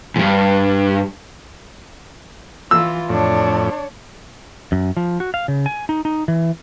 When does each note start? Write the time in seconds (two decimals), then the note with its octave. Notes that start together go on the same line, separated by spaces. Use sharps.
0.16 D2 G2
2.71 E3 F4 E6
3.09 F2 A2 D4 C#5
4.72 F#2
4.97 F3
5.20 F#4
5.34 F5
5.48 C#3
5.66 G#5
5.89 D#4
6.05 D#4
6.28 E3